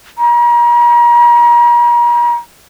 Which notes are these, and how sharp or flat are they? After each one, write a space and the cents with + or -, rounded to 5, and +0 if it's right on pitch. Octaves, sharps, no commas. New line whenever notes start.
A#5 +40